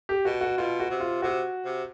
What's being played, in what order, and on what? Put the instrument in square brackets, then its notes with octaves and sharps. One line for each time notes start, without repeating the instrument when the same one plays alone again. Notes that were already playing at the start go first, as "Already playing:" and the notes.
[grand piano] G4
[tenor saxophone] B2 [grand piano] F#4
[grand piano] F#4
[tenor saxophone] B2 [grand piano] F4
[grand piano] F#4
[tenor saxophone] C3
[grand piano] F4
[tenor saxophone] C3 [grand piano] F#4
[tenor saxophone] C3